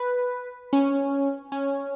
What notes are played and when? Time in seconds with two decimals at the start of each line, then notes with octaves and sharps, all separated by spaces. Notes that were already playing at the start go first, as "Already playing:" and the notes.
Already playing: B4
0.73 C#4
1.52 C#4